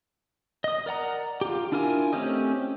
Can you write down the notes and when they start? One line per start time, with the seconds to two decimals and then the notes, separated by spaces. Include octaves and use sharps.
0.64 D#5 D#6
0.86 A#4 D5 F#5 A#5
1.41 F4 G4
1.72 D4 E4 F4 A#4 G#5
2.13 A3 C4 C#4 G4 D#5